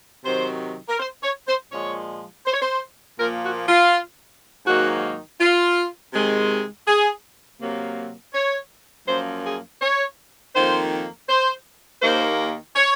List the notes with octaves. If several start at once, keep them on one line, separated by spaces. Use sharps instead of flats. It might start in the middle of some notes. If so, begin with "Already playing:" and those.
C3 D#3 F#3 C5
A#4
C5
C#5
C5
A#2 F3 G#3 C#5
C5
C#5
C5
A#2 F3 A#3 A#4
F#4
F4
G#2 D#3 F#3 A#3 F#4
F4
C3 D#3 G#3
G#4
C3 F#3 A#3
C#5
F#2 F3 A#3 C5
G#4
C#5
F2 D#3 A#3 C5
C5
D#2 D#3 A#3 C5
C#5